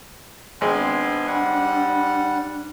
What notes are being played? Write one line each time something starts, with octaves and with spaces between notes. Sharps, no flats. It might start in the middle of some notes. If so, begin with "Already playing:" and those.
G#1 G#3 B3 C4 D4 G#5 C6
G3 F#5